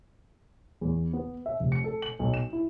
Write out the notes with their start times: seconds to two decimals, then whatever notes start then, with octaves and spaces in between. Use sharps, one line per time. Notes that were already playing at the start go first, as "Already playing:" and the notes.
0.81 E2
1.13 B3
1.46 E5
1.60 F1
1.72 C#7
1.84 A4
2.02 F#7
2.19 B1
2.34 E7
2.53 E4